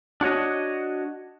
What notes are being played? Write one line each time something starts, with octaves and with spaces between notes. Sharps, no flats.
D4 F#4 C#5 D#5